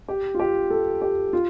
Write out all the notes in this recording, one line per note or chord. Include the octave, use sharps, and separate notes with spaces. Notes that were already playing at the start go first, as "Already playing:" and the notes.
G4
F4
G4
A4
G4
F4